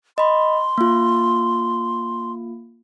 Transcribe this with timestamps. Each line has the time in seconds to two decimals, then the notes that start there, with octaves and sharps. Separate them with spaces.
0.18 D#5 B5 C6
0.78 A#3 F4